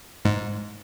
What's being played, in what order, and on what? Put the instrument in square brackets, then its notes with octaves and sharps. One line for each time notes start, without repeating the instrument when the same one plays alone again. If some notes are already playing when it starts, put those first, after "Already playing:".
[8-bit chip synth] G#2